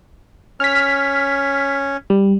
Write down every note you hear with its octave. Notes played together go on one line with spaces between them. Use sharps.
C#4 F6 B6
G3